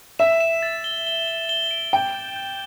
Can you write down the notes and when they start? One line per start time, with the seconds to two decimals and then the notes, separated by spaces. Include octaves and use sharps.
0.19 E5 E7
0.40 E7
0.62 A6
0.84 G7
1.07 G7
1.28 G7
1.49 G7
1.71 D7
1.93 G5 D6
2.14 G6
2.36 G6